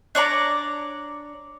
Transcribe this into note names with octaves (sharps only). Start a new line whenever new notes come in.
D4 C#5 D5 A#5